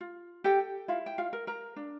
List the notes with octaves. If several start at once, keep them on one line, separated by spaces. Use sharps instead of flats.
F4
G4 A4 G5
E4 F4 F5
G5
F4 F5
A#4
A#4 A#5
D4